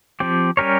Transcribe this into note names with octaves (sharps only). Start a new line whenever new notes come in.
F3 C4 G4
G3 C#4 G4 A#4 C#5